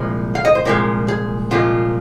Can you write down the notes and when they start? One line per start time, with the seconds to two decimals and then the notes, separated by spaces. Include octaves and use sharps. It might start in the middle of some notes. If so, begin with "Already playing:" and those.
Already playing: C2 A#2 F3 G#3
0.35 F5
0.45 D#5
0.55 C5
0.65 C2 A#2 F3 G#3 A#4
1.08 G#4
1.51 C2 A#2 F3 G#3 F4